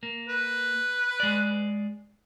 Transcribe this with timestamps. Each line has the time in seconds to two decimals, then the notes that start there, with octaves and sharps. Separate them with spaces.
0.03 A#3
0.29 B4
1.20 G#3 D5